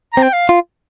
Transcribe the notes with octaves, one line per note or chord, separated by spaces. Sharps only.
C4 A#5
G5
F5
F4